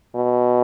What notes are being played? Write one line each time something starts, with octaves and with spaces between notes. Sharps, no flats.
B2